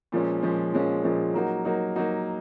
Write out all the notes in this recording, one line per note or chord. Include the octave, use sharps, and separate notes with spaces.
A#2 F3 G#3 C#4
A#2 F3 G#3 C#4
A#2 F3 G#3 C#4
A#2 F3 G#3 C#4
F#3 A#3 D#4 F#4
F#3 A#3 D#4 F#4
F#3 A#3 D#4 F#4